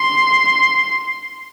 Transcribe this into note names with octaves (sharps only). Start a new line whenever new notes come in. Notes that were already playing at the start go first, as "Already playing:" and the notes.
Already playing: C6